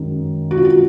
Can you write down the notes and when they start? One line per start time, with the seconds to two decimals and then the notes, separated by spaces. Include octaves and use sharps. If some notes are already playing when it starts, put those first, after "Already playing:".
Already playing: F#2 D#3 G#3
0.51 F#4
0.57 F4
0.65 F#4